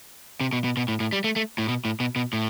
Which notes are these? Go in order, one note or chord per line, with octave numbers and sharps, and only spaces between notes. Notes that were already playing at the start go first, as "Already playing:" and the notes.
C3
B2
B2
B2
A2
A2
G3
A3
A3
A2
B2
A2
B2
B2
A2